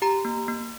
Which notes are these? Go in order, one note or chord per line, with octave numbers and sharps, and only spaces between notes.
G4 A#5
A#3
A#3